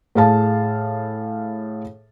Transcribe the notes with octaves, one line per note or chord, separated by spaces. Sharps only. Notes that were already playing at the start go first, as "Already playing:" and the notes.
A2 G#4 F5 A5